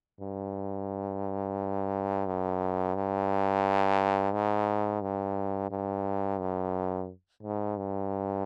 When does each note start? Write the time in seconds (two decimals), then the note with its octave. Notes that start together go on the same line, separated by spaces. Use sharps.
0.20 G2
2.26 F#2
2.95 G2
4.33 G#2
5.02 G2
5.71 G2
6.39 F#2
7.43 G#2
7.77 G2